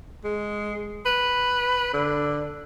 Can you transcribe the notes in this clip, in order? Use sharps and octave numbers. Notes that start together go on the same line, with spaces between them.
G#3
B4
D3